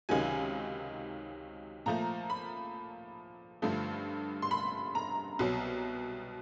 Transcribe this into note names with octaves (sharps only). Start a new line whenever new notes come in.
C#2 C3 D#3 F#3 G#5
A#2 F3 A3 A#5
B5
G2 D3 F3 A3
C6
B5
A#5
C2 B2 F#3